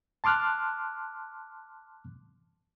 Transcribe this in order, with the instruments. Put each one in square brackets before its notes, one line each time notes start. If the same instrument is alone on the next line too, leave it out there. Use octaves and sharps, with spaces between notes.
[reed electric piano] A5 C6 D6 F6 F#6